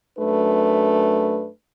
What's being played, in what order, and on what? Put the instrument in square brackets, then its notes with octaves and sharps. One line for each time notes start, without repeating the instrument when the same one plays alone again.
[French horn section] F#2 A3 D4 B4